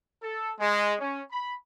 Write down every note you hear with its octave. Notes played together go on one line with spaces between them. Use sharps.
A4
G#3
C#4
B5